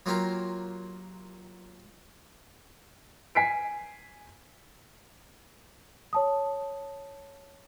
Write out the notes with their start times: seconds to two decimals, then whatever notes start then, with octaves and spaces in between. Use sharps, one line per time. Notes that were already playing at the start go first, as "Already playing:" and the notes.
0.06 F#3 A#3 F4 G4 A#4
3.35 G#5 B6 C7 D7
6.13 C#5 A5 D#6